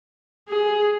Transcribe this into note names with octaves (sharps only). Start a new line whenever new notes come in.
G#4